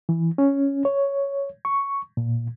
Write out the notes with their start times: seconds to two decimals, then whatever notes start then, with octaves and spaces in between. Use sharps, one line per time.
0.09 E3
0.38 C#4
0.85 C#5
1.65 C#6
2.17 A#2